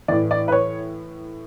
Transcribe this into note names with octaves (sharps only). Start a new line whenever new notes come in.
A2 E3 D5
D5
B4
C#5